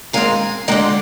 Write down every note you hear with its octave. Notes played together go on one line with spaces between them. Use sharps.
D#3 G#3 C4 F5 G#5
D3 G#3 C4 D#4 D#5 G5